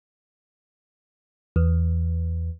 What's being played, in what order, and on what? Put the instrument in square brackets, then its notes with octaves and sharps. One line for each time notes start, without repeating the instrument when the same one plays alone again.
[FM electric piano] E2